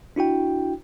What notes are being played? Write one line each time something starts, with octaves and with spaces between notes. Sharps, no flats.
D4 E4 F#4 G5